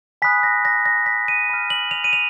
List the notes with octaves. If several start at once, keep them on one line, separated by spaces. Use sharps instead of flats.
G#5 B5 D#6 F#6 B6
A#6
A#6
A#6
B6
D#7
B5 F6
F#7
F7
D#7
F7